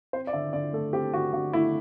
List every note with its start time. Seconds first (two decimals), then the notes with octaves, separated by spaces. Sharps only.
0.13 C4 C5
0.27 D5
0.33 D3 E5
0.53 D3 D5
0.73 A3 A4
0.93 C4 G4
1.13 D3 F#4
1.33 D3 F#4
1.53 A3 E4